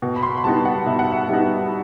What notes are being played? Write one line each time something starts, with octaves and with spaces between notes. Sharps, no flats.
B2
B5
C6
B5
G3 B3 D#4 A5
F#5
B2 E5
F#5
E5
G3 B3 D#4